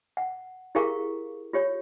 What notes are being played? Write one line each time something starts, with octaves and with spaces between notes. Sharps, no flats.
F#5
E4 G4 G#4 A#4 F5 C#6
F4 G4 C#5